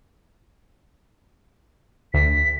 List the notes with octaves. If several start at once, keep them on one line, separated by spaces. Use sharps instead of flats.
D2 B6